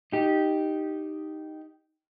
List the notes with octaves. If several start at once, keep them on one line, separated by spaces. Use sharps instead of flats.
D#4 G4